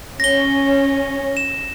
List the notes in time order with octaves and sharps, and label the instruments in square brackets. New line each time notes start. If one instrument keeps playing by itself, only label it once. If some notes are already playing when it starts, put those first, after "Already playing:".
[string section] C#4 [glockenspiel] A#6 G7
[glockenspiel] E7